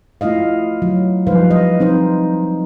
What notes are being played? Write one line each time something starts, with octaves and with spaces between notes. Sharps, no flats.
A3 E4 F4 D#5 F5
F#3
F3 G3 D#4 B4 C5 F5
D#5
C4 D#4 C5